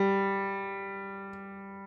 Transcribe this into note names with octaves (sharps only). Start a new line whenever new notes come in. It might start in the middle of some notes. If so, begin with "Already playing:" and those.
Already playing: G3